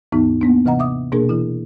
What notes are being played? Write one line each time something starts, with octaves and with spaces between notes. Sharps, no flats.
D#2 G#2 E3 B3 D#4
A#3 B3 D4
C3 E3 D#5 F#5 A#5
E5 D6 D#6
B2 A#3 D4 G#4 A#4
E3 E4